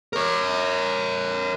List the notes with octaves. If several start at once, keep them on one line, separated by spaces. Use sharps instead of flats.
A#4 C#5